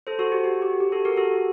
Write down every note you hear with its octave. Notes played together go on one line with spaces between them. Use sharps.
A4 C5
F#4 A4
G4
F#4
G4
G4
F#4 A4
G4 A#4
F#4 A4